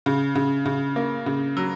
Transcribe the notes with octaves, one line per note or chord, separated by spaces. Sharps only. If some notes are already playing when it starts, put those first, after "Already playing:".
C#3
C#3
C#3
A#3
C#3
F#3